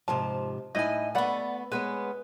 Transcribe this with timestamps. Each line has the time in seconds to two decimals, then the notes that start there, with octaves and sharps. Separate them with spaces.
0.08 G#2 C3 F3 A5
0.75 A2 D#4 E4 D#5 G#5
1.15 A3 B3 D5 F#5 B5
1.72 G#3 B3 C#4 B4